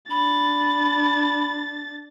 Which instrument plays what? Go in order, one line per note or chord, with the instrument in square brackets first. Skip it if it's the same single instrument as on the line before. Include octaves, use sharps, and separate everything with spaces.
[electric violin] D4 A6 [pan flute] B5